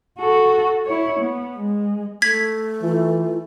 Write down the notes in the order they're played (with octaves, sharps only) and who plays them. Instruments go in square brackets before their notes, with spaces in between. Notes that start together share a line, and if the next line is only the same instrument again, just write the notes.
[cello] F#4 A4
E4 C#5
B3
G#3
[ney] A3 [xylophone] G#6 B6
[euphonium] E3 [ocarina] F4